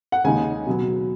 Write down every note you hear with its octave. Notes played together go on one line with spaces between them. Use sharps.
F#5
D#2 C#3 G#3 D#4 G#5
B2 F#3 B3